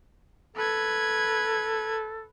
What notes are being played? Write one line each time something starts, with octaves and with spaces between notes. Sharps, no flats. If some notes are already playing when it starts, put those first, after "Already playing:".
A4 B4 G#6